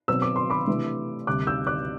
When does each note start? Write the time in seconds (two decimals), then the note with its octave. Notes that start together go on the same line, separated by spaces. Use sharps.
0.08 B2 F#3 C4 E6
0.22 D6
0.36 C6
0.50 B5 D6
0.67 C3 E3 A3 D4
1.27 D2 C3 G3 D6 F#6
1.47 E6 G6
1.67 D6 F#6